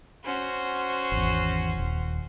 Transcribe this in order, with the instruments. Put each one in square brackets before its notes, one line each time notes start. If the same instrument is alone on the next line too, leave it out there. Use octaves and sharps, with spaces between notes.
[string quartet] C#4 F#4 C5
[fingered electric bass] G#1 E2
D#1